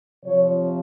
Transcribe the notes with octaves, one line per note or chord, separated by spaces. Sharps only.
C3 F3 C#5